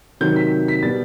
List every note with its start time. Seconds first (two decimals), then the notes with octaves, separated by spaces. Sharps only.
0.21 C3 D#3 F#3 C4 G6
0.36 B6
0.68 B6
0.83 B2 G3 B3 A6